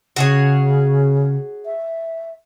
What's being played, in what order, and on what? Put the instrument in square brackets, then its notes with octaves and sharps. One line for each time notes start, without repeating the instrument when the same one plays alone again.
[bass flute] C#3 [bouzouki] F#4 G#4 C#5
[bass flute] E5